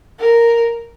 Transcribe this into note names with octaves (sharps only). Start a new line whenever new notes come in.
A#4